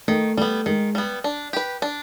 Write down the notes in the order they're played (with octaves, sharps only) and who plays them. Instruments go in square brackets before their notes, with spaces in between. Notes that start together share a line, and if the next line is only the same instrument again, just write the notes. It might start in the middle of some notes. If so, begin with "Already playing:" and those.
[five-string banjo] D#3 [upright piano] A3
[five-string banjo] G3 B3 [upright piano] A3
[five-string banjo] D#3 [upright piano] G#3
[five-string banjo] G3 B3
D4
G4 B4
D4